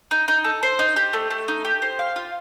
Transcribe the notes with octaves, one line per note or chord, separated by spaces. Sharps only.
D#4
D#4
A4
C5
D#4
G4
A3
A3
D#4
G4
C5
F5
F4